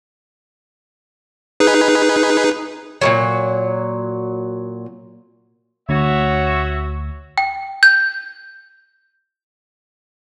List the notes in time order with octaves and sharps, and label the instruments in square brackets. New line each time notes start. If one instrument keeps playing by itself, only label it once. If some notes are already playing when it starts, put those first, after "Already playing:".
[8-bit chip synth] D#4 G#4 B4
[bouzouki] A#2 D#3 F#3
[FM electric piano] D2 [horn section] F#4 C#5 E5
[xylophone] G5
G6